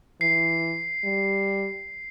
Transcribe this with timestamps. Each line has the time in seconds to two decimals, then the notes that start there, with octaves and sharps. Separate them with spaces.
0.21 E3 C7
1.04 G3